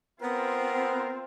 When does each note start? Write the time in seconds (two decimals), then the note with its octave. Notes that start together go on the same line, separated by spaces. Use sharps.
0.23 B3 C4 F4 A#4